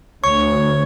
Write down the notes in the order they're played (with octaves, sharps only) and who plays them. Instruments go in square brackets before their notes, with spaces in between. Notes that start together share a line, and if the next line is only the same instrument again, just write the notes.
[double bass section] D2 [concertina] C#5 [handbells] C#6